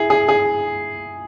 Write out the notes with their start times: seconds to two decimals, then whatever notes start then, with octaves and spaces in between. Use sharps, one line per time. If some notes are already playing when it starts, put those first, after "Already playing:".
Already playing: E4 G#4
0.10 G#4
0.29 G#4